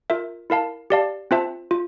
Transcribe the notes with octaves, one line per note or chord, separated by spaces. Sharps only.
F4 A#4 E5
E4 A#4 F5 A5
G4 D5 F5 A5
C4 F4 C5 E5 A5
F4